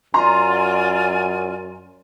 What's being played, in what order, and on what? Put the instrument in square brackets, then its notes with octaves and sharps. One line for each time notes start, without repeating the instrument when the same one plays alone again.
[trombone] F#2 [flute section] F4 D5 G#5 [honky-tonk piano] A#5 C6